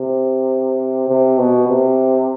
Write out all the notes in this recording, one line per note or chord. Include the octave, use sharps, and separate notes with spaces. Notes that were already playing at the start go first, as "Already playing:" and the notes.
Already playing: C3
C3
B2
C3